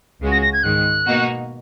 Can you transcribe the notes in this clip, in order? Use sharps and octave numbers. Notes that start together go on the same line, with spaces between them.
C#2 C#3 G#3 C#4 F#4
A#6
A#6
G#6
G#2 D#3 G#3 F#6
B2 A#3 D#4 F#4